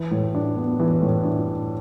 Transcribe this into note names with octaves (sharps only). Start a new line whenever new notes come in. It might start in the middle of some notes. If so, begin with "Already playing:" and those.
Already playing: E3
A2
D4
B3
E3
A2
D4